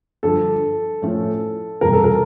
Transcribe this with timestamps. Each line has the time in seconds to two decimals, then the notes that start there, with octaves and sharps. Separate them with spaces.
0.23 G2 D3 F3 A4
1.02 A2 F3 A3 C#4
1.81 F1 E2 B2 G3 A#4
1.93 A4
2.04 A#4